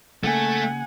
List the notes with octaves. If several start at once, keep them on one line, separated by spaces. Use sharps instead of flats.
C#3 A3 A#3 F#5 G#5